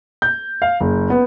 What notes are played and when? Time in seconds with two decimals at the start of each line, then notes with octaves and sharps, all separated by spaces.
0.22 G6
0.62 F5
0.80 F#1
1.10 B3